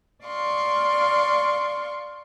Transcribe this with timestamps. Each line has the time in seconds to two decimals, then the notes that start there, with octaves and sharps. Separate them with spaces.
0.25 D5 F5 C6 C#6